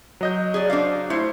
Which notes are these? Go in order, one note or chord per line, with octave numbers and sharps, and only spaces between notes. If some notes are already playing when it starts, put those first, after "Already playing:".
F#3 D#5 G6
G#4 D5
D4 C5 F5
A3 E4 C5